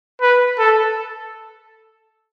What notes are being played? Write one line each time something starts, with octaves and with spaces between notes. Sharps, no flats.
B4
A4